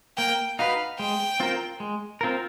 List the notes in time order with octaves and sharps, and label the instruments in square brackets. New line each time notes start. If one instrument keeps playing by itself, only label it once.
[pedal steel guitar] A#3 [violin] G5
[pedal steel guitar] D#4 F#4 B4 [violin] F5
[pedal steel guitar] G#3 [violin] G5
[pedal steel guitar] C4 F4 A#4
G#3
C4 F4 A#4